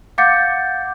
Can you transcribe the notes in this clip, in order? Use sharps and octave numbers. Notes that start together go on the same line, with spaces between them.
F5 F#5 D6 G6 A6 C#7